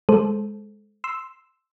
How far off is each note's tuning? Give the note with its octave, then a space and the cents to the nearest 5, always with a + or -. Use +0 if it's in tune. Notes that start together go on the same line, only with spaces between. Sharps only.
G#3 +0 A4 -15 C5 +0
C6 +0 E6 +0